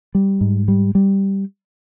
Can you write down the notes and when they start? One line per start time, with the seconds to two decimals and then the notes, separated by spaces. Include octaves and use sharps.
0.15 G3
0.41 G#2
0.68 G3
0.95 G3